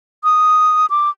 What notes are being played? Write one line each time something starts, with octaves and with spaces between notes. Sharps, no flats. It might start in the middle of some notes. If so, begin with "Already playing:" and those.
D#6
D6